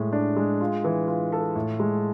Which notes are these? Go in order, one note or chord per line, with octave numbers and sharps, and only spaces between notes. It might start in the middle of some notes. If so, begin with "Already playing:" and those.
Already playing: A2 G#3
D4
G#3
F4
E3
F4
A4
A2
G#3